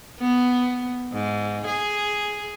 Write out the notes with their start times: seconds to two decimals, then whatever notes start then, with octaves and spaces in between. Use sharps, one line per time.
0.20 B3
1.13 G#2
1.66 G#4